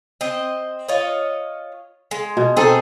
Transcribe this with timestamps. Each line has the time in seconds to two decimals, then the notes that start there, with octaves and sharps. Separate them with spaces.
0.21 C4 D#5
0.89 F4 C#5 D#5
2.11 G#3
2.37 B2
2.57 C4 D#4 G#4 A4 D#5